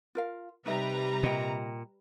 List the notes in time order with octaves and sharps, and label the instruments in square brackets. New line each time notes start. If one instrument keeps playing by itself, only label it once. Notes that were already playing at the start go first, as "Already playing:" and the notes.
[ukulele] F4 A#4 F5
[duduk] C3 [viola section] G3 B4 A#5 [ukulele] D#4 E5
[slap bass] A#2 [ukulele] D#5 G5